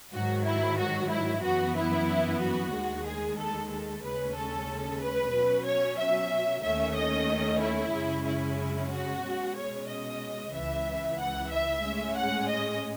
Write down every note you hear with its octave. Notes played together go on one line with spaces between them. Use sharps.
G#2 D#3 F#3 F#4
E4
F#4
E4
F#2 E3 B3 F#4
E4
F#4
D#2 D#3 G#3
G#4
A4
A4
D#2 C#3 G#3 C#4 B4
A4
B4
B2 F#3 C#4
C#5
E5
D#2 D#3 A3 C#4 E5
D#5
E4
F#2 C#3 G#3 C#4
E4
F#4
B2 G#3 C#4
C#5
D#5
C#2 C#3 E3 E5
F#5
E5
A2 G#3 C#4
F#5
D#5